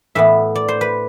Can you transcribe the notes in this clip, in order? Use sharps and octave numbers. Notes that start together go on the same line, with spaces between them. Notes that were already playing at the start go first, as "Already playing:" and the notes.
A2 E3 B3 E5
D5
C5
B4